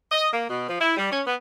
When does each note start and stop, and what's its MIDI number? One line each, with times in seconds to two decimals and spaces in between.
0.11 0.28 75
0.32 0.45 58
0.48 0.65 47
0.68 0.76 53
0.80 0.94 64
0.97 1.09 55
1.10 1.21 61
1.26 1.34 59